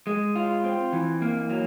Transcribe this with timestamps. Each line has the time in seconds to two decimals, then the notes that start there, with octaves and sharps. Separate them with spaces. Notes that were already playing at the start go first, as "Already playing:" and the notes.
0.07 G#3
0.36 F4
0.64 C4
0.93 E3
1.22 A#3
1.50 F#3